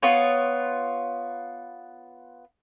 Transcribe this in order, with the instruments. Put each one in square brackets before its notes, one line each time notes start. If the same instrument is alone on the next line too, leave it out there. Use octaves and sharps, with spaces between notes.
[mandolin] B3 F4 C#5